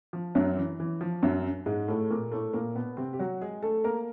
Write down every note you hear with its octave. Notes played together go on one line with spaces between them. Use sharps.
F3
F#2 F#3
E3
E3
F3
F#2 F#3
G#2 G#3
A2 A3
A#2 A#3
A2 A3
A#2 A#3
B2 B3
C3 C4
G4
F#3 F#4
G#3 G#4
A3 A4
A#3 A#4